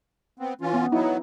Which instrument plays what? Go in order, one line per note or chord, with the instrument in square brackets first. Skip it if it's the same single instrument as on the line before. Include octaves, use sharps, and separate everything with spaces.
[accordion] B3 C4
E3 C#4 F4
[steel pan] B3
[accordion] F#3 B3 [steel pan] D#4 E4